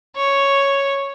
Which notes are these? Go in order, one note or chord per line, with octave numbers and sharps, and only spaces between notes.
C#5